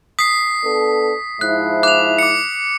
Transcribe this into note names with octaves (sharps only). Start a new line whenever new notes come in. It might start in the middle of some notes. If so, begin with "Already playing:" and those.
D#6 B6 C7
B3 D4 A4
G#2 F3 E4 F#6
D6 F#6 F7
D6 C#7